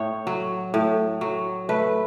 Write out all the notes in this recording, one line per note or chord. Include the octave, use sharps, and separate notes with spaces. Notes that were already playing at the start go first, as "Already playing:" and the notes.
Already playing: A2 C#5
F#3
A2
F#3
A3 B4